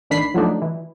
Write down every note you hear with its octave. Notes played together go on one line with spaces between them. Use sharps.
A1 D#3 D4 B5 B6 C7
F3 F#3 A3 D4 D#4
E3